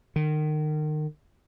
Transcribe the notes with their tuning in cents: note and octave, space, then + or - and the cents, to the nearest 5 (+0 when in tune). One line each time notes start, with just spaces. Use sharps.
D#3 -30